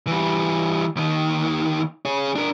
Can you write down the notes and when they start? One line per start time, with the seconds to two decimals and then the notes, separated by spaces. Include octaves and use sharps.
0.07 E3 G3
0.96 D#2 D#3
2.05 G#4 C#5
2.35 D4 A#4